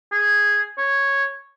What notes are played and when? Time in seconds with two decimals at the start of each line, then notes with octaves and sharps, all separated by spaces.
0.12 G#4
0.78 C#5